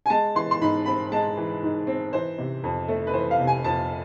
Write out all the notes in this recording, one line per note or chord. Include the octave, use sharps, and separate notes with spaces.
G#5
G#3 A5
E3 C6
C6
G#2 B5
C4 B5
G#3 A5
E3
G#2
C4
E3 C5
C3
F2
A3
B4
E3 C5
F5
C3
G#5
F2 A5